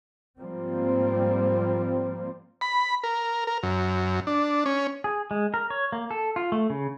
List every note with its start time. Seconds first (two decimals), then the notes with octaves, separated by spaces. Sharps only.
0.39 G#2 F3 G3 A#3 C4
2.61 B5
3.04 A#4
3.47 A#4
3.63 F#2
4.27 D4
4.66 C#4
5.04 G#4
5.31 G#3
5.54 A#4
5.70 C#5
5.92 A#3
6.11 A4
6.36 F4
6.52 A3
6.70 C#3